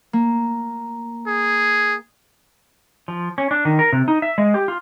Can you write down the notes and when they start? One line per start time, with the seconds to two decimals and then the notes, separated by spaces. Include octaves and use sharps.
0.13 A#3
1.27 G#4
3.08 F3
3.38 C#4
3.51 D4
3.65 D#3
3.79 A#4
3.93 C3
4.08 D#4
4.22 E5
4.38 G#3
4.54 G4
4.68 F4